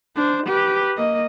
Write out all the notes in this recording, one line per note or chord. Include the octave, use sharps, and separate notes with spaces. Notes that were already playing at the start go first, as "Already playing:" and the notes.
D4 C5
G4 B4
A#3 D#5